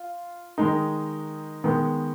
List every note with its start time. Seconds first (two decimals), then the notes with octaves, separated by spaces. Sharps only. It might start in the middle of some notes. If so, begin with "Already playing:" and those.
Already playing: F4
0.58 D#3 G#3 D#4
1.64 D#3 G#3 B3